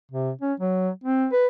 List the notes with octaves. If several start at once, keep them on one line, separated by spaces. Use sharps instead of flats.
C3
C#4
F#3
C4
B4